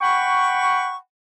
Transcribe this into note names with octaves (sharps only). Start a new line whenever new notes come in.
F#5 G5 B5 C#6